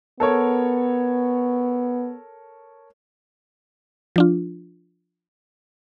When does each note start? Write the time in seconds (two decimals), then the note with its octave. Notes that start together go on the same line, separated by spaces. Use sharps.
0.20 B3 A4 A#4 C#5
4.16 F3 D4 F4